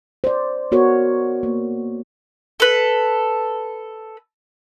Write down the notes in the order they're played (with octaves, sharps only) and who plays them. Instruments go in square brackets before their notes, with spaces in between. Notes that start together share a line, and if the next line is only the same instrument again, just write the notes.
[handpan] C5 D5
B3 F#4 A#4 C#5
A#3
[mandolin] A4 B4